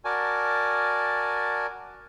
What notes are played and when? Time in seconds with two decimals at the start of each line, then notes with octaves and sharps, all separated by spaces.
0.05 F#4 A#4 D5 G#5 A5